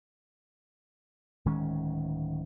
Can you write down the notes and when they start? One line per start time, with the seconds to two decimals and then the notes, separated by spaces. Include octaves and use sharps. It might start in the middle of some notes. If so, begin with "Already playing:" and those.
1.45 D1 D#3 G#3 C#4